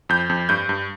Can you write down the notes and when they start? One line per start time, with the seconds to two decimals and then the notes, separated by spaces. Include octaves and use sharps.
0.09 F2 G6
0.30 F2
0.49 G2 G6
0.69 G2